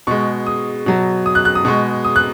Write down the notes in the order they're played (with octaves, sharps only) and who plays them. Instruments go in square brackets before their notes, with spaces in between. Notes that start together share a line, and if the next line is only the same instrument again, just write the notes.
[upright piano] B2 G#3 C#6
D#6
B2 F#3
D#6
F#6
F#6
D#6
B2 G#3 C#6
D#6
F#6